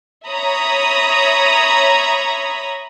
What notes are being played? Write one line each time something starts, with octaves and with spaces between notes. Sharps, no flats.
C#5 E5 A#5 B5 D#6